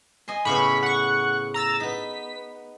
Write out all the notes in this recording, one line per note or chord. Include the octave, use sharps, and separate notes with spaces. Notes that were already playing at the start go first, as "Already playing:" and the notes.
D#5 G#5 C6
A2 C#3 B3 B5 C#6
F#5 B5 C#6
A#5 E6 A6
B3 D#4 B6